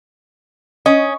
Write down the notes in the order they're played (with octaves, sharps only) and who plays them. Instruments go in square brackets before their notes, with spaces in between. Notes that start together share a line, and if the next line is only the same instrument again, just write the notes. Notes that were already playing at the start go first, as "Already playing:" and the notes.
[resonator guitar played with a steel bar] C#4 [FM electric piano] D#5